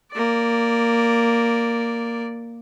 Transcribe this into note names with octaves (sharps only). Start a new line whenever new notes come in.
A#3 D5